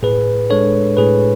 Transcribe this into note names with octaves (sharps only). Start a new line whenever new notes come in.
A2 G#4 B4
G#3 D4 A4 C#5
A2 G#4 B4